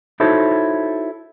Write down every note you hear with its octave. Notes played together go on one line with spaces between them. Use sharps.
D#4 E4 F#4 A4 C5 C#5